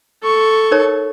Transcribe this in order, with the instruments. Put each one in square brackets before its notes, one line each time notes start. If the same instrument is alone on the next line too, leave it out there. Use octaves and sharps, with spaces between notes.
[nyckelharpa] A4 C#6
[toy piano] D#4 A#4 C#5